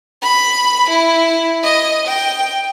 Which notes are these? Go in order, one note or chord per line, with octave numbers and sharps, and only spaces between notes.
B5
E4
D#5
G5